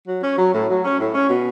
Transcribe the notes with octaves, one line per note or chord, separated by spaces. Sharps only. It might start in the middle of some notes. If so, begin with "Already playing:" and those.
F#3
C#4
F#3
A2
F#3
C#4
A2
C#4
B2